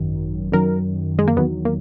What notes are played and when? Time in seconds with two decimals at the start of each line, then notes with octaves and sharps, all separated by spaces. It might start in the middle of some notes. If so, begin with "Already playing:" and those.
Already playing: G#1 F#2 D#3 F#3
0.52 F#2 D#3 F#3 A#4
1.19 G#3
1.28 A#3
1.37 E2 D#3 F#3 B3
1.65 A#3